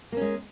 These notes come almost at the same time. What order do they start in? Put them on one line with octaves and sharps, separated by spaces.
A#3 C#4 G#3